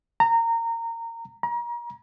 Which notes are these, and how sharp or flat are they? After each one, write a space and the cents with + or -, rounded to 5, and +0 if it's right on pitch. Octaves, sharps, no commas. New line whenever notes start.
A#5 -20
A#5 +35